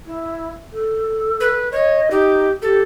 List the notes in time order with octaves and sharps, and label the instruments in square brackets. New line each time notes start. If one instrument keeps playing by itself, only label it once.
[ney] E4
A4
[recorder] B4
[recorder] C#5 [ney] D#5
[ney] D#4 [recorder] G4
[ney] G4 [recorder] A4